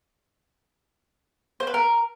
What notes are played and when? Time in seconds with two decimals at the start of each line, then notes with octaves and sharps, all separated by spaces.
1.60 C5
1.67 B4
1.74 A#4